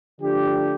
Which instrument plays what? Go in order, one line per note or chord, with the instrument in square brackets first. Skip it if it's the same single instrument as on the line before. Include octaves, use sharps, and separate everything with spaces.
[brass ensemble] D3 F3 A3 D4 G4